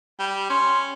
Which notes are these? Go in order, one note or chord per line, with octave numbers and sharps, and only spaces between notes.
G3
C#4 C6